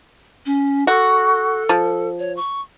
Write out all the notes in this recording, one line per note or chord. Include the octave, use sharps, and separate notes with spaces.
C#4
F#4 A4
F3
C#5
C#6